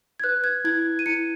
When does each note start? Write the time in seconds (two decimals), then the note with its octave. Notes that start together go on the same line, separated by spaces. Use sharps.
0.20 G#6
0.24 B4 F#6
0.44 G#6
0.64 E4 G#6
0.99 D#7
1.06 E4 C#7